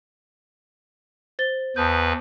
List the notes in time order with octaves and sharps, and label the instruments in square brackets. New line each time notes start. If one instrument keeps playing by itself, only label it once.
[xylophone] C5 A6 G7
[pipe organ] E2 B4 [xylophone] A5 D#6 G6